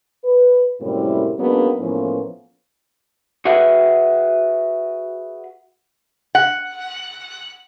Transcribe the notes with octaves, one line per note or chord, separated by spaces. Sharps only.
B4
F#2 A2 C3 G3 A#3 E4
F#3 G#3 A#3 B3 C#4 D4
A2 E3 F3 A#3 B3 C#4
F#4 G#4 B4 E5 F#5
F#5